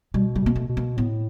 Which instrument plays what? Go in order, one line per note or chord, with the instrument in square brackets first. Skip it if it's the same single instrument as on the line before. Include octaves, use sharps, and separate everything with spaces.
[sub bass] B2 [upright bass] G3
[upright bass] G3
[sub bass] B2 [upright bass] A#3
[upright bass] A3
[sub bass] B2
[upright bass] A#3
[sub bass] A2 [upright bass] B3